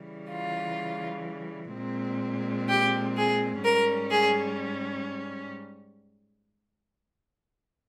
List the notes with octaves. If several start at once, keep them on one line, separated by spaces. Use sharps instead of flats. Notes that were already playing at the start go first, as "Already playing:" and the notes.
Already playing: C#3 E3 G3
F4
A#2 G#3 C4
G4
G#4
G#2 G3 C#4 A#4
G#4